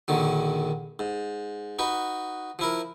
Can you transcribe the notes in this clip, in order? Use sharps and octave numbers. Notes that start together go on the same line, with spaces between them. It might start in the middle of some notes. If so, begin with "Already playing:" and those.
A#1 D3 D#3 F#3
G#2
D#4 F#4 B4
F3 E4 A#4